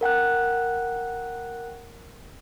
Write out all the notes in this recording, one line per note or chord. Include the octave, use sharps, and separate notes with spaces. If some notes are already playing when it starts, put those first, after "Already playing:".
A#4 F#5 G5 F#6